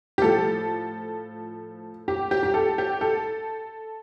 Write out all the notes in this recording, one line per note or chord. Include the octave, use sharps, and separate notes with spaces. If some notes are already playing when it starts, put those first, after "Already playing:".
G4
A2 F3 A4
G4
G4
G4
A4
G4
A4